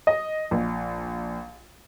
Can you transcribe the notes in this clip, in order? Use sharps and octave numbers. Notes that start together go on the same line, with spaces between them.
D#5
A#1